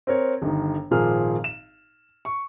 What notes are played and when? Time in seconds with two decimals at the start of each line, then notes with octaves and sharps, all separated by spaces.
0.07 C4 A#4 C#5
0.42 G1 D#3
0.91 G#1 A#2 F3 A#3 G#4 F6
1.44 E7
2.25 C#6